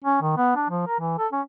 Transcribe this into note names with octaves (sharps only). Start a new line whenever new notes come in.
C#4
D#3
B3
D4
F3
A#4
E3
A4
C#4